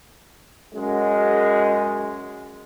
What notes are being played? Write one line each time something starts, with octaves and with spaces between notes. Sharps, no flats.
F#2 G#3